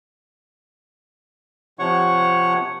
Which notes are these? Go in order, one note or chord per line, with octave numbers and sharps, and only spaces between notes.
C3 F3 C#5 F#5 C#6